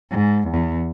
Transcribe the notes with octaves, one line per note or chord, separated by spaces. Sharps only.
G#2
E2